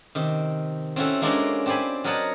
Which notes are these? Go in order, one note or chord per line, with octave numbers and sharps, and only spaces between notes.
C3 D#3
C4 C#4 E4 F#4 A4
G#3 A#3 C#4 D4 C5 D5
C4 G4 C5 D5 G#5 B5
F#3 A#4 D#5 F#5 A5